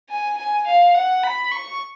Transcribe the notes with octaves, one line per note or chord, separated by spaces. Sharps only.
G#5
G#5
F5
F#5
B5
C#6